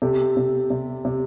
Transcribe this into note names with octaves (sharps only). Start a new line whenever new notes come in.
C3 G4 A4
C3
C3
C3